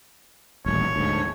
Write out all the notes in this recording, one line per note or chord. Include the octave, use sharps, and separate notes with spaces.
D#1 A1 C#5
D2 G#2